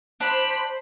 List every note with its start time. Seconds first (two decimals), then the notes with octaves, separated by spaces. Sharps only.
0.20 D4 C5 B5